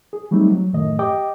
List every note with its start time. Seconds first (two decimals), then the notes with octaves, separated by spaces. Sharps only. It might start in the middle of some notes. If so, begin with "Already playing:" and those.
0.13 G#4
0.31 F#3 G3 A3 C4 D#4
0.50 F#3
0.73 F#2 A2 D#3 A3 D#5
0.99 G4 D#5 G5 D6